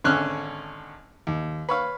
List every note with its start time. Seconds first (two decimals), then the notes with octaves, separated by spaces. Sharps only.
0.04 G#1 D3 C#4 F6 F#6
1.27 D#2
1.69 B4 C#5 F5